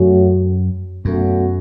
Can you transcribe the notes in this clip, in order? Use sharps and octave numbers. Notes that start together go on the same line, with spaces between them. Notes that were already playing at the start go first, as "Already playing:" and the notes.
Already playing: F#2 F#3 A3 C#4 F#4
F#2 B2 F#3 A3 C#4 F#4